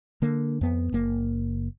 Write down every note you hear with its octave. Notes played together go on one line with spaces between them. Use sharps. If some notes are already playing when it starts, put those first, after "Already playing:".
D3 A#3
F2 B3
F#1 A#3